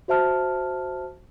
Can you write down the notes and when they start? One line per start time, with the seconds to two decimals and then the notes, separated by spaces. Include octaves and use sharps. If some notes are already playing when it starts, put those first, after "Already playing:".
0.08 F#4 C5 E5 A5 F6